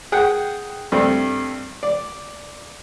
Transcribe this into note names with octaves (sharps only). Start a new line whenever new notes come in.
G#4 F#5 G5
G2 G3 A3 C4
D5